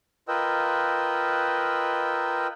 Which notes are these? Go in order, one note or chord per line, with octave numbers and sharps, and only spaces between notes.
F4 A#4 B4 D#5 G5 E6